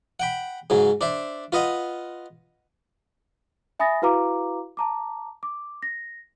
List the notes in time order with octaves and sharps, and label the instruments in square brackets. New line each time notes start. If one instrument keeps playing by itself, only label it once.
[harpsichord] F#5 G5 B5
G#2 C#3 F#3
D4 C5 E5
F4 B4 D#5 F#5
[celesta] E5 G#5 B5 D#6 A6 A#6
E4 F#4 B4 F5 A#5 D6
A5 A#5 D6
D6
A#6